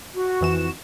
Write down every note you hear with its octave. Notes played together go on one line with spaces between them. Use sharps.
F#4
F2 E3 E7